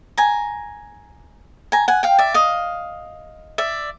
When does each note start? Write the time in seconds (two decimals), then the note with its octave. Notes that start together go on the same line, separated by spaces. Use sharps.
0.18 G#5 A#5
1.72 G#5 A#5
1.88 F#5 G#5
2.03 F5 G5
2.19 D5 E5
2.34 D#5 F5
3.58 D5 E5